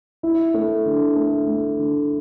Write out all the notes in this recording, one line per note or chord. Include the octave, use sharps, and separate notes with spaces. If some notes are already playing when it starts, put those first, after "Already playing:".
E4
A3
D3
A3
A3
D3